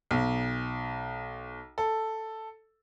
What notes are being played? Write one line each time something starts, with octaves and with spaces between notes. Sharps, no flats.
B1
A4